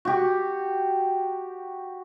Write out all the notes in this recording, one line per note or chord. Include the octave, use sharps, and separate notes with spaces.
F#4 G4